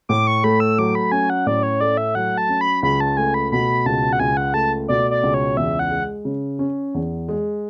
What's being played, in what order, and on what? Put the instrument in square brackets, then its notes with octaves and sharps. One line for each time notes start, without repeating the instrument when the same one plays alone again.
[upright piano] A2 [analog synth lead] D6
[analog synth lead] C#6
[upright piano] A3 [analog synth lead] B5
[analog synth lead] E6
[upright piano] F#3 [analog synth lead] D6
[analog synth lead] B5
[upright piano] C#4 [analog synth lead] G#5
[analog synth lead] F#5
[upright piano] A2 [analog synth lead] D5
[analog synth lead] C#5
[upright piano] A3 [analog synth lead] D5
[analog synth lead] E5
[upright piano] F#3 [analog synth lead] F#5
[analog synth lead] A5
[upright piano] C#4
[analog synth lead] B5
[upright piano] C#2 [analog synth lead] B5
[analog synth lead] A5
[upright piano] A3 [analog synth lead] G#5
[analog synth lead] B5
[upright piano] B2 [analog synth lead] B5
[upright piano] C#2 [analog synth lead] A5
[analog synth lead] F#5
[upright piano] C#2 [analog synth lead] G#5
[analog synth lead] F#5
[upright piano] A3 [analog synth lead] A5
[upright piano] B2 [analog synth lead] D5
[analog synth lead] D5
[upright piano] C#2
[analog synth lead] C#5
[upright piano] E2 [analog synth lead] E5
[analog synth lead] F#5
[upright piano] G#3
C#3
C#4
E2
G#3